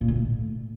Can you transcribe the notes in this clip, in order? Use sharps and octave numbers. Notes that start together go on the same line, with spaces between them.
A#2
D3
A2